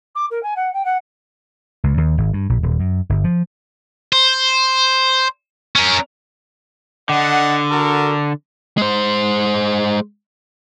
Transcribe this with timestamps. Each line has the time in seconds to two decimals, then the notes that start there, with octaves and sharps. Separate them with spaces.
0.15 D6
0.30 A#4
0.43 G#5
0.56 F#5
0.73 G5
0.85 F#5
1.84 C#2
1.97 D#2
2.18 G#1
2.33 G2
2.49 A#1
2.63 D#1
2.80 F#2
3.09 G1
3.24 F3
4.13 C5
5.76 C#4 A#4
7.09 D3 D#5 F#5
7.71 F#4 A4 A#4
8.78 G#3 C5